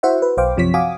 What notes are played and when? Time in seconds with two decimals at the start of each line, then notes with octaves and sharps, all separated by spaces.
0.03 E4 F#4 C5 E5 F#5
0.22 B4
0.37 B1 C5 F5 G5 D6
0.57 F#2 C3 F3 C#5 B6
0.74 F#4 F5 G#5 D6 D#6